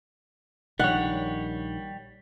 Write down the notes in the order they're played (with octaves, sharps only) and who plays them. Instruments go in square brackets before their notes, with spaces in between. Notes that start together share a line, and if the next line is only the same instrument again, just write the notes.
[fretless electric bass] A#1 D#3 [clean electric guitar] G3 C#5 [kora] F#5